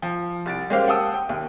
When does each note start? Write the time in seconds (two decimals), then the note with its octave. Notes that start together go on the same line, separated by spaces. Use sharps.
0.02 F3
0.46 C2 A6 D7
0.70 G#3 A#3 C#4 G4 C5 F5
0.88 F#5 G5 A5 D#6 E6
1.14 G5
1.29 D#2